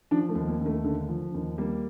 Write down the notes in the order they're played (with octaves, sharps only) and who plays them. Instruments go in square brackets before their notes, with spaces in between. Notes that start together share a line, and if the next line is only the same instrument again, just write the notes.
[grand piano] F3 D4
A3
D#2
A#3
D#2
A3
D3
F3
D#2
G3 A#3